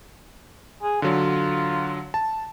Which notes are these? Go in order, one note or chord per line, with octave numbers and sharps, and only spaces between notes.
G#4
D3 F#3 F4
A5